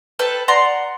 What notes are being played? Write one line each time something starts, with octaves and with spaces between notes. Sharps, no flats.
A4 B4 G5 A5
D5 F#5 A#5 C6